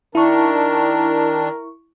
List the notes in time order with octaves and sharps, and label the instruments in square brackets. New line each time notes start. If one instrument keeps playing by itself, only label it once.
[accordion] D#3 D4 [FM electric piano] E4 C#6 [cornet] A#4